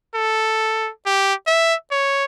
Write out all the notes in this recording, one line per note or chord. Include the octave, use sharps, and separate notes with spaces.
A4
G4
E5
C#5